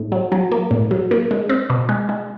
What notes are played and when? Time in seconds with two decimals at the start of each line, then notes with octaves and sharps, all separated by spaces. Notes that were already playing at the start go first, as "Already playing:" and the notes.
Already playing: A2
0.12 F#3
0.32 F#3
0.52 A#3
0.71 A2
0.91 F#3
1.11 A#3
1.31 G#3
1.49 C4
1.70 B2
1.89 G#3
2.09 G#3